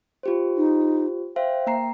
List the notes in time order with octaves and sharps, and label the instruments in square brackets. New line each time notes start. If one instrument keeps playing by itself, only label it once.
[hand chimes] F4 G4 C5
[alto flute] D#4
[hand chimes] C5 E5 F5 [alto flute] G5
[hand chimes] A#3 A#5 C7